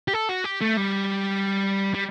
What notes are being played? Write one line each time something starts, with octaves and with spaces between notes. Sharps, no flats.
G4
A4
F#4
G4
A3
G3
G3